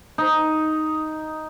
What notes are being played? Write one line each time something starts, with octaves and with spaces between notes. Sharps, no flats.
D#4